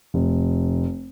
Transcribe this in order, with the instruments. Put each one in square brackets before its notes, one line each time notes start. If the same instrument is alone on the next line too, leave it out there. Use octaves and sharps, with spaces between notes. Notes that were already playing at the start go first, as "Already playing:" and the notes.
[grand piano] F1